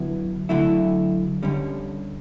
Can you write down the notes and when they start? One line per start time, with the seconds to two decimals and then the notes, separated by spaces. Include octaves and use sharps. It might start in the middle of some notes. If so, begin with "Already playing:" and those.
Already playing: D3 F#3 B3 E4
0.49 D3 F#3 A3 E4
1.43 D3 G3 C#4